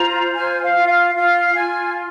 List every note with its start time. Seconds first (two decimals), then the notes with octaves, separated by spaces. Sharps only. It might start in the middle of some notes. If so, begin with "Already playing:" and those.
Already playing: F4 C5 A#5
0.34 F4 G#5
0.62 F5
0.74 F4
0.87 F5
1.14 F4 F5
1.54 F4 G#5